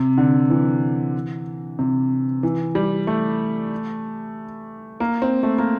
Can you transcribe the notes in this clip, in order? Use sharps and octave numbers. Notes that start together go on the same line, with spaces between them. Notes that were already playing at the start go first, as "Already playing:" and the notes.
Already playing: C3
D3
E3
C3
E3
G3
A3
A#3
C4
A3
A#3